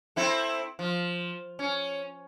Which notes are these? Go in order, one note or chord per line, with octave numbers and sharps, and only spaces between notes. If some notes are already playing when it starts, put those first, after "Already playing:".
C4 E4 A4
F3
C#4